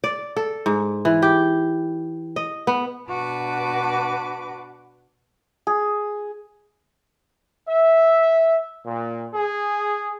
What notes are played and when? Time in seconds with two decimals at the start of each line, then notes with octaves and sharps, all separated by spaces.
0.04 D5
0.37 A4
0.66 G#2
1.05 E3
1.22 G4
2.36 D#5
2.67 B3
3.08 B2 D4 F#4 B4 A5 D6
5.67 G#4
7.68 E5
8.85 A#2
9.34 G#4